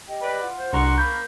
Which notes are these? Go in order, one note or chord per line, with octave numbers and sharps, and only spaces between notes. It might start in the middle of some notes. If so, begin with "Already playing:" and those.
G4 D#5 G5
B4 D5
F4 F#5
C5
C2 D4 F#4 A#5 C6 C#6
A#3 A#4 B5 C#6 G6